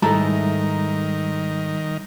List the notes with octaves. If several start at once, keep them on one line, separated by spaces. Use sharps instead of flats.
G#2 D#3 G3 A3 E4 A4 A#5